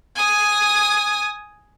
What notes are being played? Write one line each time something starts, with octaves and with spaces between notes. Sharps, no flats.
G#5 D#6